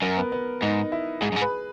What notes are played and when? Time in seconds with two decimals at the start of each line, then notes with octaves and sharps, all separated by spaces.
0.02 F#2 A#4
0.17 B3
0.32 B3
0.62 G#2 D#4
0.92 E4
1.21 G#2 G#4
1.32 F#2
1.36 G#2
1.42 B4